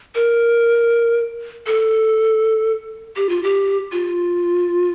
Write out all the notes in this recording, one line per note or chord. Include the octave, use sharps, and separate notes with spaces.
A#4
A4
G4
F4
G4
F4